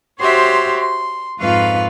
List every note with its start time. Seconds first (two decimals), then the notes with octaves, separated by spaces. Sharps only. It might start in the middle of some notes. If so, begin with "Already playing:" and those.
0.20 F#4 G4 C5 C#5 E5 C6
0.77 C6
1.38 F2 G#2 F4 B4 F5 C#6